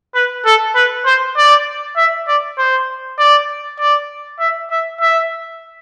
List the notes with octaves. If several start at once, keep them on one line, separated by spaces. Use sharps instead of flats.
B4
A4
B4
C5
D5
E5
D5
C5
D5
D5
E5
E5
E5